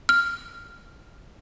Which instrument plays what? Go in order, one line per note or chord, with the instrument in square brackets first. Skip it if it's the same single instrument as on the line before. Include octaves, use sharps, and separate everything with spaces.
[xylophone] F6